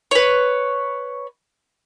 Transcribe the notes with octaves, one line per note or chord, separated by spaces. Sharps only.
B4 C#5